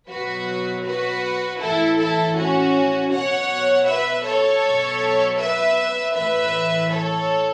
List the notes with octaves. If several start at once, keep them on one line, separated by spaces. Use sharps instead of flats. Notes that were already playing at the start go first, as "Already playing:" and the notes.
B2 F#3 F#4 B4
F#4 B4
A2 E3 E4 A4
E4 A4
C#4 F#4
B2 F#3 C#5 F#5
B4 E5
A4 C#5
B2 F#3
B4 E5
A2 E3 B4 E5
A4 C#5